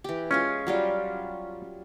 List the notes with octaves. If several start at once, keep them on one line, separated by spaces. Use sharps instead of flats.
E3 G4
G#3 C#4 F4 G#4
F#3 G3 F4